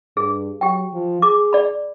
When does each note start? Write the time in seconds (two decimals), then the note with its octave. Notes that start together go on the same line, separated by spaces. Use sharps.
0.17 G2 G#4
0.61 F#3 G4 G5
0.93 F3
1.22 G#4 D6
1.53 D5 B5